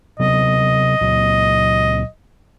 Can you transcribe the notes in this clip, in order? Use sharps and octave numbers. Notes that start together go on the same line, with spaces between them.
C3 F#3 B3 D#5
C#2 A#2 F#3